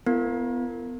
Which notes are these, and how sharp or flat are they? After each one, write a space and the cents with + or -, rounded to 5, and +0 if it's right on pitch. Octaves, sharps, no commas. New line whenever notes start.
B3 +20 E4 +45 A#4 -35